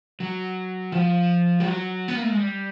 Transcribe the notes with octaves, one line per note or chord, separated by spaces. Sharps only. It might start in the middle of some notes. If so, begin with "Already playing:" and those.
F#3
F3
G3
F#3
B3
A#3
A3
G#3
G3